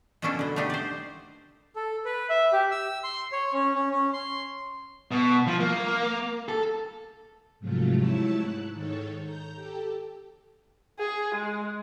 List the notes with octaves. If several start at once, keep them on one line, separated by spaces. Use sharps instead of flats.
B2 F#3 A#3 C#4 D4 A4
D3 B3
A3 B3 D4 D#4 G4
C5 D5
A4
B4
E5
G4
E6
C6
C#5
C#4
C#4
C#4
C6
B2
F3
A#3
A4
G#2 C3 F3 F#3 A3 F4
G#2 A3 E4 C#5 A5 E6
G#2 F#6
G#2 D#3 A4 C#5
A#5 G6
G4 A4
G#4
G#3